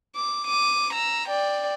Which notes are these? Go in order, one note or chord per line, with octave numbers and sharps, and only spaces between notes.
D6
D6 D#7
A#5 E6
D5 G5